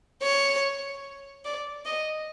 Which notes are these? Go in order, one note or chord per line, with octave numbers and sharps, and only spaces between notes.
C#5
D5
D#5